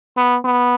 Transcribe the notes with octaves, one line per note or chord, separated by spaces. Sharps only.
B3
B3